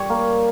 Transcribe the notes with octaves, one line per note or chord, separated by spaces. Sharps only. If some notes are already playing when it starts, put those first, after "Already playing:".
Already playing: G3 C#5
A#3